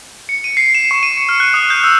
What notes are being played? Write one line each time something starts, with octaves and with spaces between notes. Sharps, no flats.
C#7
D#7
C7
E7
C#6
D#7
C#7
F6
F#6
D#6
G6
E6